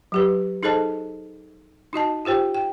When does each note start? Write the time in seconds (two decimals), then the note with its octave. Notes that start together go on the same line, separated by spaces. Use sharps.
0.12 F#3 G4 B4
0.63 D#4 G#4 A4 C5 D#5 A5
1.93 D#4 F#4 D#5 A5
2.25 F4 G4 C5 G5
2.55 G5